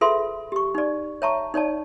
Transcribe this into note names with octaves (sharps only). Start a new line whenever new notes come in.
F4 G#4 A4 B4 E5 C6
G4 C#6
D#4 D5
C#5 E5 A5 A#5 C#6
D#4 C#5 D5 A5